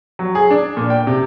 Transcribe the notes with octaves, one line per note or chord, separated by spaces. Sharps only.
F#3
G#4
D4
A#2
G5
C3